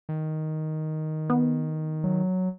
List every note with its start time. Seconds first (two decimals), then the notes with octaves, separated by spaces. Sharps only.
0.09 D#3
1.30 B3
2.04 F#3